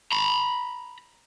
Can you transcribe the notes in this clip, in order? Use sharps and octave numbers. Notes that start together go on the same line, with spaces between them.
A#5 B5